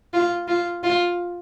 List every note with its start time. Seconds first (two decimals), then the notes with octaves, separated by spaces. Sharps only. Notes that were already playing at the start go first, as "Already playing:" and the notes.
0.13 F4
0.48 F4
0.83 F4